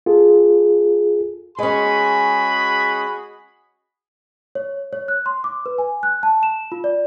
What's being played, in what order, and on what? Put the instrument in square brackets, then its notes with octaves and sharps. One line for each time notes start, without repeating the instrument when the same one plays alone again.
[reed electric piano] F4 G#4 A4
[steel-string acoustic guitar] G#3 C#4 [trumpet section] F#4 G#4 B5
[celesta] C#5
C#5
F#6
C6
D6
B4
G#5
F#6
A5
E7
F4
D5